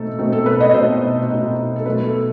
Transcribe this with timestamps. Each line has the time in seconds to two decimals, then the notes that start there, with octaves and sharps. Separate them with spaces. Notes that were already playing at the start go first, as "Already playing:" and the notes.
Already playing: B2 A3 C4 D#4 A4
0.19 B2 A3 C4 D#4
0.32 A4
0.46 B4
0.61 D#5
0.74 B2 A3 C4 D#4 C5
1.30 B2 A3 C4 D#4
1.76 A4
1.86 B2 F#3 A3 D#4 B4
2.04 A4